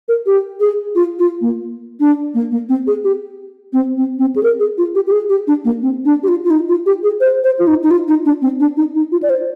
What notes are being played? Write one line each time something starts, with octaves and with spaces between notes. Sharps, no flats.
A#4
G4
G#4
F4
F4
A#3
D4
A#3
A#3
C4
G#4
G4
C4
C4
C4
G#4
A#4
G#4
F4
G4
G4
G#4
G4
D4
A#3
C4
D4
G4
F4
F4
D#4
F4
G4
G#4
C5
C5
F4
D#4
D#4
F4
D#4
D4
C4
D4
D#4
D#4
F4
D5
C5